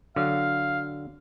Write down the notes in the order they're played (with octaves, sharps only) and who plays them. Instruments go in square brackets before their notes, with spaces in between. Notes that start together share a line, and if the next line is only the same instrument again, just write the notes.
[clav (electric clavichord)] D3 F#3 [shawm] F5